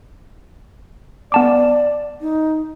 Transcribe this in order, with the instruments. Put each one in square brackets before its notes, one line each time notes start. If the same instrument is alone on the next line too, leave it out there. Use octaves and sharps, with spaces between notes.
[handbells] B3 A5 D6 [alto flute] D5
[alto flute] D#4